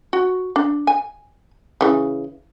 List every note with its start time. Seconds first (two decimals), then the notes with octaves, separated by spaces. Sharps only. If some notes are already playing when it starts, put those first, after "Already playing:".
0.13 F#4
0.56 D4
0.87 G#5
1.81 C#3 E3